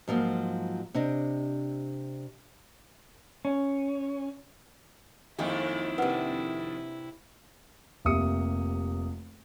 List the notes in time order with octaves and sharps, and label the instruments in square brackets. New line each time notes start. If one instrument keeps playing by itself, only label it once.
[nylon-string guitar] G#2 F3 F#3 A#3
C3 D4 G4 D#5
[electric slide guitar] C#4
[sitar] F2 D#3 [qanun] G#3 A#3 E5 [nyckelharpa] E4
[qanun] C3 D4 [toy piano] A#4 B4 F#5
[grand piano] F1 C3 A#3 E5 D#6 C#7